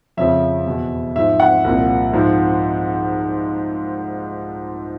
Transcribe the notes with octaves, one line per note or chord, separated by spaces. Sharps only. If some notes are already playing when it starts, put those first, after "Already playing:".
F2 C#3 F3 E5
E2 B2
G#2 F3 E5
F#5
C2 A#2 F3
G#2 F3